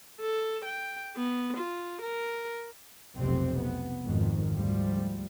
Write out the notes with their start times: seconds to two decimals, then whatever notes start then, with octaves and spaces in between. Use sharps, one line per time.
0.20 A4
0.65 G5
1.16 B3
1.57 F4
2.02 A#4
3.17 F1 B1 F2 C3 C4
3.61 B3
4.04 G#1 F2 D#3
4.54 D2 G#2 F3 G3